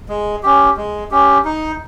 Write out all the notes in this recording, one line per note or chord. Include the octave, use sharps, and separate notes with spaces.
G#3
C#4 G4
G#3
C#4 G4
D#4